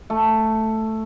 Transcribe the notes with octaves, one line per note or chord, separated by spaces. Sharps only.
A3